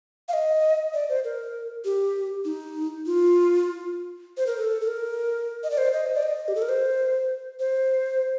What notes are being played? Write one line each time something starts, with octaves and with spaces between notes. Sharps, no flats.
F5
D#5
D5
C5
A#4
G4
D#4
F4
C5
A#4
A4
A4
A#4
D#5
D5
C5
D#5
C5
D5
D#5
G4
A4
A#4
C5
C5